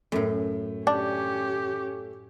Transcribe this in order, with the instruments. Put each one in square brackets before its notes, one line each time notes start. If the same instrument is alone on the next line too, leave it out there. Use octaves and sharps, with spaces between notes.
[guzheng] F#2 A2 [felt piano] A3
[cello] C#4 G4 [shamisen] D4